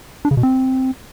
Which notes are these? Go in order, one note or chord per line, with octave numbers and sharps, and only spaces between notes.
D4
C#3
B2
C4